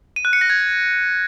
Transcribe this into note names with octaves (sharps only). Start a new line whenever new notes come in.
D#7
F#6
C#7
A#6
G#6